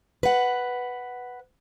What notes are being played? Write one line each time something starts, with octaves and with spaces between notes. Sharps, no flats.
B4 F#5